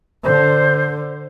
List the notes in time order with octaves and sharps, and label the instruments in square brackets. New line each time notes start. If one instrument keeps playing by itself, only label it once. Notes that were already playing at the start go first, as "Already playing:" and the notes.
[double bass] D3 [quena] C5